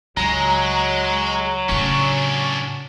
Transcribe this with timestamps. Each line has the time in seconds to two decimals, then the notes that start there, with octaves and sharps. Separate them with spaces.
0.17 C#2 F#3 G#3 A#5
1.69 A2 C#3 C#4 D4 C#6